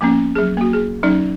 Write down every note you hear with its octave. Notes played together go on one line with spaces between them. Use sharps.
F3 A#3 B3 C#4
F#3 G#4
A#3 F#4
G#4
F#3 C#4 D#4 D5